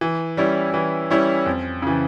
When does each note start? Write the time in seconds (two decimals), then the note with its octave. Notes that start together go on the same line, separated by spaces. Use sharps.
0.01 E3
0.37 G3 C#4 E4
0.74 E3
1.10 G3 C#4 E4
1.46 F2
1.82 C#3 E3